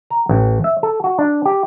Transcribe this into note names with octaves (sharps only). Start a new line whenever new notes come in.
A#5
A1
E5
A4
F#4
D4
G4